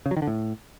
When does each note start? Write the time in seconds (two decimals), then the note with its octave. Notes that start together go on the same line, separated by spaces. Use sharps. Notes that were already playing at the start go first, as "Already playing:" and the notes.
0.06 C#3
0.11 F#3
0.17 D#3
0.22 D3
0.27 A2